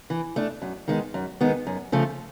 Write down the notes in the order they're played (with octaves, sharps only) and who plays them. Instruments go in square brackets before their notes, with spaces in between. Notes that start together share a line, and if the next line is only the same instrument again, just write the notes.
[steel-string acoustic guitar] E3
A3 D4
F#2
D#3 G#3 B3
F#2
D#3 G#3 B3
F#2
C#3 F3 A3